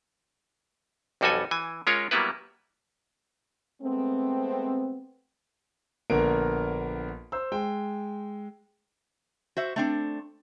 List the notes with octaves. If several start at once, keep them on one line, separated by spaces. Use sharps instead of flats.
B1 F2 G3 F#4 A4 G#5
E3 G#5
G#3 C#4 F4 A#4 C#5
F#3 G3 A#3 B3 E4 B4
G#3 A3 B3 C4
A#1 D3 A#3 B3 A#4 D7
C5 E6
G#3 G5
F#4 C5 E5
A3 C4 D4